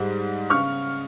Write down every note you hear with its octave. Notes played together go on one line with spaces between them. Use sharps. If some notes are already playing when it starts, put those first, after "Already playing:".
Already playing: G#2 G3
C#3 C#6 F6